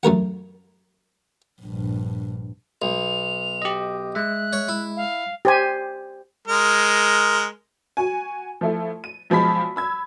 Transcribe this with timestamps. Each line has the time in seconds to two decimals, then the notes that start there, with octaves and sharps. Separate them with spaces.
0.03 F#2 A3 A#4 F#5
1.62 A#1 G2
2.82 B1 F7
3.62 G4 D#5
4.15 G#3 E5 F#6
4.53 C#5
4.68 E4
4.97 F5
5.45 G4 C5 G#5
6.47 G#3 A#4
7.97 F#4 G#5
8.61 F3 A3 E4
9.04 D#7
9.30 B1 F3 G#3 B5 B6
9.76 B5 E6 G#6